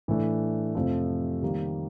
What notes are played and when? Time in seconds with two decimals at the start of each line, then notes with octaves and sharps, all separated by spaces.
0.08 A2 E3 A3 D4
0.75 F2 C3 F3 A3
1.42 D#3 G3 A#3